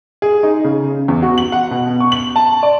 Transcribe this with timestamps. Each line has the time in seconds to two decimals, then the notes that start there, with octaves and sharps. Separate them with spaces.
0.22 G#4
0.43 D#4
0.64 C#3
1.08 E2
1.23 F#4
1.38 F#7
1.52 F#5
1.71 B2
2.00 C#6
2.12 F#7
2.36 A5
2.63 D5